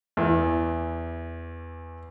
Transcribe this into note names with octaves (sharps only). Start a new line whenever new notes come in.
E2 E3